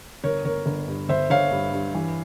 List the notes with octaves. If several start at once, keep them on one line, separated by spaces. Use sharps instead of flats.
G1 A#4 C#5
G1 A#4 C#5
G1
G2
G1 C5 E5
G1 C#5 F5
G2
G2
E3